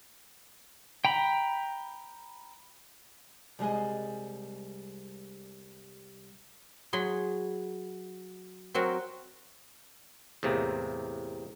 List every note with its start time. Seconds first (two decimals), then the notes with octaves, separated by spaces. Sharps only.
1.05 G5 A#5 B5
3.59 C2 G3 G#3 G#4 D#5
6.93 F#3 G#4 B5 C6
8.74 F#3 C4 F#4 A#4
10.43 E2 A2 C3 A#3